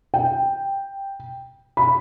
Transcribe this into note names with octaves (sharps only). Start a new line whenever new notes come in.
G5
B5